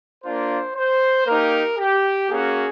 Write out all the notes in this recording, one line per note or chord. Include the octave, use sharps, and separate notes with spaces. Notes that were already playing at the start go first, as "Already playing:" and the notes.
A#3 D4 F4 C5
C5
A#3 D#4 G4 A#4
G4
A#3 C#4 F#4 G#4